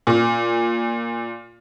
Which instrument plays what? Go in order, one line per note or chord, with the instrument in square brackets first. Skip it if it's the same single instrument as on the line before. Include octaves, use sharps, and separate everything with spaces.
[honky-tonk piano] A#2